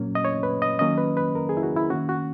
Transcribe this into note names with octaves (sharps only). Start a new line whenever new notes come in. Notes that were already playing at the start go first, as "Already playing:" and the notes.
Already playing: A#2 F#3 A#3 C#4
D#5
C#5
B4
D#5
D#3 F#3 A#3 C#4 D#5
B4
B4
A#4
G#4
E4
F#4
E4
D#3 A#3 C#4 F#4
F#4